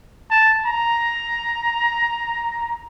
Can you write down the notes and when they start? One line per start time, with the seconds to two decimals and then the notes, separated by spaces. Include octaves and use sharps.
0.31 A5
0.66 A#5